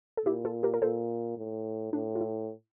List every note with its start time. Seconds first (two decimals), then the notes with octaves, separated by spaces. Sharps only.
0.17 A4
0.26 A#2 E4 G4
0.45 F4 A4
0.63 G4 A#4
0.74 A#4
0.82 A#2 A4 C5
1.38 A2
1.93 A2 D4
2.15 F4
2.21 E4